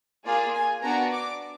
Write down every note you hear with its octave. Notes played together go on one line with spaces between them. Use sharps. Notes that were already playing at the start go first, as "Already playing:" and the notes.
A#3 F4 G#4 D5
G#5
B3 D4 F#4 A#5
D6